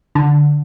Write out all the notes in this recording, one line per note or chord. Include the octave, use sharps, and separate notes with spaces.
D3